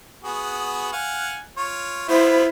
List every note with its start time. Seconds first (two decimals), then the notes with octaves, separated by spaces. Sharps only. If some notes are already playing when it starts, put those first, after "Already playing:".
0.24 B3 F#4 G#4
0.93 F5 F#5 G#5
1.57 F4 C#5
2.09 B3 E4 F4 C5